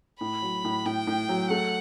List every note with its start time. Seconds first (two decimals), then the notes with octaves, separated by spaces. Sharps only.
0.21 A2 B5
0.42 F#3
0.64 A2
0.86 A2 G5
1.07 A2
1.29 F#3
1.50 A3 F#5